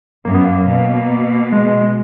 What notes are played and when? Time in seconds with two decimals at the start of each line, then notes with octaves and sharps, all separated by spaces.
0.25 F#2 A#3
0.34 B3
0.44 A#3
0.67 B2
1.52 G#3
1.67 G#3
1.81 G#3